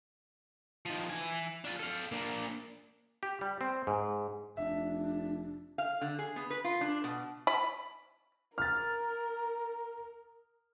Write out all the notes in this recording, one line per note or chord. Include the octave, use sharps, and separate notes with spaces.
D#3 F3
E3 G#5
D4 F4
A4 F5
A#3 D4
G4
G3
C4
G#2
F1 D4 E5
F5
D3
G#4
B3
B4
F4
D4
B2
B5
A#4 F6 A6